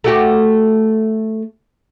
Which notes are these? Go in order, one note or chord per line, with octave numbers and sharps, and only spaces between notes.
A3 F#4 G4